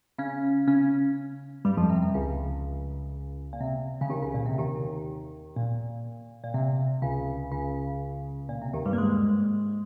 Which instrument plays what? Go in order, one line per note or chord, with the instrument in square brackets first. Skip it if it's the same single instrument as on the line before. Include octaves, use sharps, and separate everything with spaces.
[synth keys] C#3 C#4
C#3 C#4
G2 G3
F2 F3
C3
C3
C#2 C#3
A#2
C3
C#3
D#2 D#3
C#2 C#3
A#2
C3
D#2 D#3
A#2
A#2
C3
C#2 C#3
C#2 C#3
A#2
C3
D#2 D#3
G2 G3
A#3
G#2 G#3